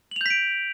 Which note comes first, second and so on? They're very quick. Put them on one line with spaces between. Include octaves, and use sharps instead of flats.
F#7 F7 G6 B6 D7